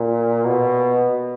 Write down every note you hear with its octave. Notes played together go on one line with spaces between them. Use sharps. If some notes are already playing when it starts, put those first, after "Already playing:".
Already playing: A#2
B2